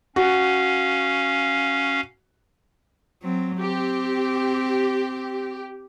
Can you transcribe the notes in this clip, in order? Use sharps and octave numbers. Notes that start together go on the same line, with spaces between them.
C#4 F#4 F5
F#3 C4
C4 G4